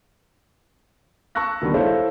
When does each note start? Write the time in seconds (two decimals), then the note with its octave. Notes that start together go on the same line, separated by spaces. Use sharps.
1.35 A5 C#6 E6 F#6 A#6
1.61 D2 D#3 G3 B3
1.74 E4 A4 C5 C#5 F5